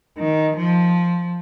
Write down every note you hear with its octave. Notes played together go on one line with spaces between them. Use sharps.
D#3
F3